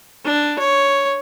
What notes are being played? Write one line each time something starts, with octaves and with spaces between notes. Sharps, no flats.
D4
C#5